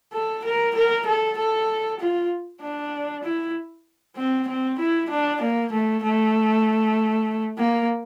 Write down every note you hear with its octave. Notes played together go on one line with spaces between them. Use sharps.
A4
A#4
A#4
A4
A4
F4
D4
E4
C4
C4
E4
D4
A#3
A3
A3
A#3